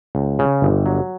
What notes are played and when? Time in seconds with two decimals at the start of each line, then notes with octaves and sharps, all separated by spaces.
0.15 C#2
0.39 C#3
0.62 G1
0.86 F#3